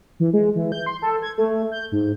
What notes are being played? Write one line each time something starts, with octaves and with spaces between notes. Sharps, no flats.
E3
G#3
E3
G6
C6
A4
G#6
A3
G6
G#2